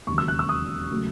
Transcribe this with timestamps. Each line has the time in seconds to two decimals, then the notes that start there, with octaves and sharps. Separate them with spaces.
0.07 E1 D#2 C#3 F#3 C#6
0.18 E6
0.28 F#6
0.39 E6
0.49 D#6
0.90 C#3 F#3 A3